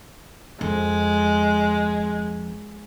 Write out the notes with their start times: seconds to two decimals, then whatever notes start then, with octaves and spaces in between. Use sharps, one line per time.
0.61 F2 G#3